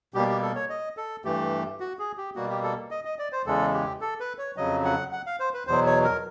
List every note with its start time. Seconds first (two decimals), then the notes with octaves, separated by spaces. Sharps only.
0.14 B2 G3 A#3 G4
0.28 G4
0.42 A4
0.56 C#5
0.70 D#5
0.97 A4
1.25 G2 E3 A3 G4
1.80 F#4
1.99 G#4
2.17 G4
2.36 B2 G3 A#3 F#4
2.50 G4
2.63 A4
2.91 D#5
3.05 D#5
3.19 D5
3.33 C5
3.46 E2 C#3 E3 G#3 A4
3.74 G4
4.01 A4
4.20 B4
4.38 C#5
4.56 F2 C#3 F#3 D#5
4.85 F#5
5.12 F#5
5.26 F5
5.40 C5
5.54 B4
5.67 E2 B2 F#3 C5
5.86 C#5
6.04 A#4